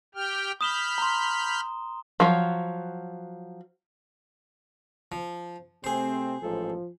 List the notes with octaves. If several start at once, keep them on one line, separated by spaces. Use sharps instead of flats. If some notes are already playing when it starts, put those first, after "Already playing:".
G4 G5 F6
B5 D#6 F6 G6 E7 G7
A#5 C6
F3 F#3
F3
C3 A3 C4 G#4 C5
A1 G#2 F3 A4